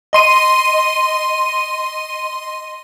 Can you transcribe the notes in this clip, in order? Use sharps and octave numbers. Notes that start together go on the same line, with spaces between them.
D#5 C6 D#7